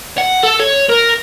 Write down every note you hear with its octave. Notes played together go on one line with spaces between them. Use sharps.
F#5
A4
C#5
A#4